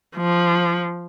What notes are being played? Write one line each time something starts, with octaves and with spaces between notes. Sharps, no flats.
F3